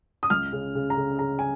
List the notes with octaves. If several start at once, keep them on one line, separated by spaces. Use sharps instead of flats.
D#6
C#2 F6
C#3
C#3
A#5
C#3
C#3 A#5
G#5